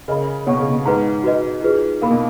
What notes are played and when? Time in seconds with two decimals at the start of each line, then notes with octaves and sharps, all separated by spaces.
0.08 C#3 A#4 D#5 G#5 B5
0.46 B2 C#5 F#5 C#6
0.59 C#3
0.70 B2
0.85 G#2 B4 F#5 A#5
1.24 F#4 B4 D#5
1.63 F4 G#4 B4
2.02 A#2 A#4 F5 B5
2.11 B2